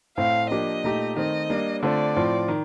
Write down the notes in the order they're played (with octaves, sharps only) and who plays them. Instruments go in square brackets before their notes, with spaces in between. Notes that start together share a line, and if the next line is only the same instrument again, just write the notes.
[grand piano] A2 A3 C4 [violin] F5
[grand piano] F3 A#3 D4 G4 [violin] D#5
[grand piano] A#2 A3 D#4 G4
[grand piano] D#3 A3 C4 [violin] D#5
[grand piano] G3 A#3 D4
[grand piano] D3 A3 C4 F4 [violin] D5
[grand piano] A2 F3 C4 F4
D#3